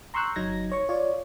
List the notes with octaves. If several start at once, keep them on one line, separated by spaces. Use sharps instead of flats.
A#5 C6 C#6 E6 F#6 G6
G1 F#3 D#4 G#6 A#6
C#5 C#6
F4 C#5 D5